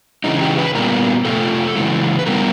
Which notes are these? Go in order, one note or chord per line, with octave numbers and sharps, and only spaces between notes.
C#3 E3 G#3 D#4
G4
B4
A#2 G3 B3 A#4
C3 F3 A3 A4
C#3 E3 G#3
B4
B2 G3 B3 A#4